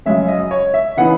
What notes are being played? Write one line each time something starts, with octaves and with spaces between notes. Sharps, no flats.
F#2 C#3 G#3 C#4 E5
D#5
C#5
E5
C#3 E3 B3 D#4 F#5